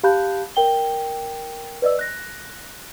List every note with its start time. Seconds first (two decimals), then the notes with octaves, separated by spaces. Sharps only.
0.03 G4 F5 A5 B5 F#6 G6
0.56 A#4 G5 G7
1.82 B4 D5 D#5 E6
1.99 F#6 A#6